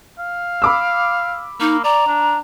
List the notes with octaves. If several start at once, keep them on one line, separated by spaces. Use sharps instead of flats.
F5
B5 D6 E6
A#3 D#4
D5 A#5
D4